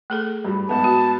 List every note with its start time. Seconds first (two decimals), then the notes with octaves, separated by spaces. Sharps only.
0.10 A3 G#4 A4
0.44 G2 G3
0.69 G#2 B3 A5
0.84 F#4